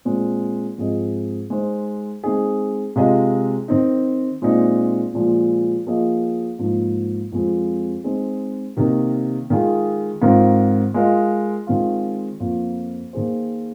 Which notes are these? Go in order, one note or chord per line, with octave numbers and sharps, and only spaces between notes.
A#2 G#3 C4
G#2 F3 C4 G#4 D#5
G#3 D#4 C5
G#3 C4 D#4 G#4
C3 G#3 F4 G#4 D#5
D#3 C4 D#4
A#2 G#3 C4 D#4
A#2 F3 G#3 F4
F3 A#3 G#4 D#5
G#2 F3 A#3 D#4
F2 F3 G#3 C4
G#3 C4 D#4 G#4
C3 D#3 A#3 D#4 A#4
D#3 G#3 F4 G#4
G#2 D#3 C4 F4 A#4
G#3 F4 A#4 D#5
D#3 G#3 C4 F4
F2 F3 A#3 F4
D#3 A#3 G#4 C5